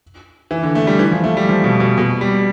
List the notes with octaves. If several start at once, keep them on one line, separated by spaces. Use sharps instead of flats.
E3
D3
A3
G3
E3
F3
A3
G3
F3
B2
B2
B2
G3